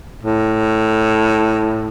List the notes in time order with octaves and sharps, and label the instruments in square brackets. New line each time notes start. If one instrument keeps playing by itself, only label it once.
[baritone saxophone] A2